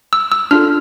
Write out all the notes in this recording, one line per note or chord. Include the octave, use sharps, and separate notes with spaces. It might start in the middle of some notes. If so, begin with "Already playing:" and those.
E6
E6
D4 F4 A4 F6